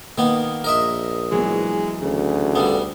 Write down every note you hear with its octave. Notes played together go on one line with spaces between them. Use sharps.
D#3 A#3 B3
A#1 A#4 D#5 E5
E3 F#3 G#3 B3
D2 C#3
D3 G3 B3 A4 F5